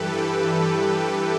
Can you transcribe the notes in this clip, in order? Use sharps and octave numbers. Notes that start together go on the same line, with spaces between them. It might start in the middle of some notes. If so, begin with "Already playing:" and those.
Already playing: G2 E3 G4 A4 B4
A4
B4